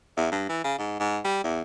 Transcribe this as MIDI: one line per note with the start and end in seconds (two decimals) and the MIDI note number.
0.17 0.27 40
0.32 0.45 43
0.49 0.64 52
0.64 0.76 49
0.79 0.97 44
1.00 1.18 44
1.25 1.39 55
1.44 1.62 40